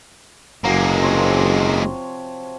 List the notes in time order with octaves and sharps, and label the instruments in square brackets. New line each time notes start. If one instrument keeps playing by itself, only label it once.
[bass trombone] F#1 [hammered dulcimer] F#3 [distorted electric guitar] G#3 A#3
[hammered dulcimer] C3 F3 C#5